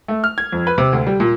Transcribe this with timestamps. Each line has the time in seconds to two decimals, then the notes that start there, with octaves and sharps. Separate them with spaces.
0.08 A3
0.24 F6
0.38 G#6
0.52 F2
0.67 B4
0.78 C3
0.93 D2
1.07 G3
1.20 A#2